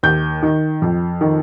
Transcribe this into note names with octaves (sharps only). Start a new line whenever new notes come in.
D#2 G6
D#3
F2
D#3